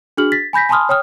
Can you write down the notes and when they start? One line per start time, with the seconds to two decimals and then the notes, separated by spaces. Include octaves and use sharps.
0.17 D4 F#4 G#4 F6 F#7
0.32 A6 B6
0.53 G#5 B5 G6 A#6 B6
0.69 G#5 A5 B5 C6 D#6 F6
0.89 C#5 G5 D#6 F6